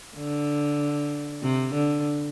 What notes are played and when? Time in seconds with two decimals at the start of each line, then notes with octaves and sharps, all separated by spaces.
0.16 D3
1.43 C3
1.74 D3